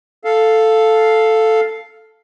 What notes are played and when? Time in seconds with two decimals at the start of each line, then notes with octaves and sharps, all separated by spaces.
0.25 A4 F5